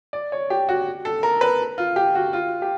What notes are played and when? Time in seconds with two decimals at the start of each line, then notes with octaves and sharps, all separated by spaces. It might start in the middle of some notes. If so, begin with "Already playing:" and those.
0.13 D5
0.32 C#5
0.50 G4
0.69 F#4
1.05 A4
1.23 A#4
1.41 B4
1.78 F4
1.96 G4
2.15 F#4
2.33 F4
2.62 G4